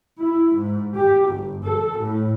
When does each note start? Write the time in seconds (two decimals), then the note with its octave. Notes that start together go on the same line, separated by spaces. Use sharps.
0.21 E4
0.55 G#2
0.96 G4
1.27 G1
1.65 A4
1.97 A2